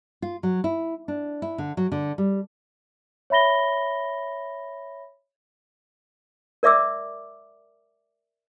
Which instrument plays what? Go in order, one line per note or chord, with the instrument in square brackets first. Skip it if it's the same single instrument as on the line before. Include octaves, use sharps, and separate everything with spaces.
[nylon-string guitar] F4
F#3
E4
D4
E4
D3
F#3
D3
G3
[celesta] C#5 E5 B5 A#6 G7
[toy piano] A#4 D5 E5 D6 E6